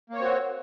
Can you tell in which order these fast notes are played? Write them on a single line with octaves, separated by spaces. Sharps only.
A#3 C#5 C4 F#4